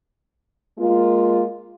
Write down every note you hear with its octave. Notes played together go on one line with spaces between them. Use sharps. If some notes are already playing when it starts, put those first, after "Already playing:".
G#3 A#3 F4